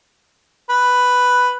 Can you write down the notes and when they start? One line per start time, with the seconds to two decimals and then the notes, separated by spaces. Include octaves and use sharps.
0.70 B4